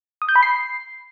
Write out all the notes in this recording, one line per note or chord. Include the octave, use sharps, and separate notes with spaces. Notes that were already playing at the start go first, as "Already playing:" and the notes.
D#6
G6
B5
C7